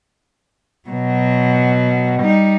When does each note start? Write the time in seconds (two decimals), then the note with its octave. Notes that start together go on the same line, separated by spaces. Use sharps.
0.89 B2 F#3
2.19 G3 D#4